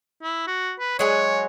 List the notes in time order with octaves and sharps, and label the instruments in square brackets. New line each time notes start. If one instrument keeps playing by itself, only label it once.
[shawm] E4
F#4
B4
[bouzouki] F#3 G#3 G#5 [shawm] C#5